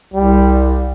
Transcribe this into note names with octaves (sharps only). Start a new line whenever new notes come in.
C2 G3